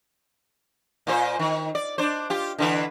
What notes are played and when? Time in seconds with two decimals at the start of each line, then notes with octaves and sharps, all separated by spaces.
1.07 A#2 F4 C5
1.39 D#3
1.75 D5
1.98 D4 C5
2.30 F4 G4
2.58 D3 E3 B4